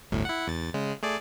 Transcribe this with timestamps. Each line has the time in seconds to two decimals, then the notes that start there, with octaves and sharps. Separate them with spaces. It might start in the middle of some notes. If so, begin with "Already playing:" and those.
0.11 G1 D2 A2
0.25 E4 F#5
0.47 E2 A6
0.74 C#3 G#3
1.03 A3 G#4 D5